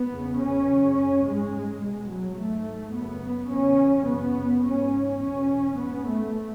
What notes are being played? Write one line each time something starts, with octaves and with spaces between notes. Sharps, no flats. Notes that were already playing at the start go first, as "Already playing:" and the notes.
Already playing: B3
E2 C#3
C#4
F#2 C#3
C#4
G#2 G#3
E2 B2 G#3
F#3
G#2 A3
F#2 C#3 B3
E2 C#3 C#4
F#2 C#3 B3
G#2 C#4
E2 B2 C#4
G#2 B3
A3